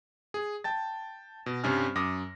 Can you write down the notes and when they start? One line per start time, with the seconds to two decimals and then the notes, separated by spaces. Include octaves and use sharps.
0.34 G#4
0.64 G5 A5 A6
1.46 B2
1.64 G2 C3 C#4 C5 G#5 F6
1.95 F#2 D6 D#6 A#6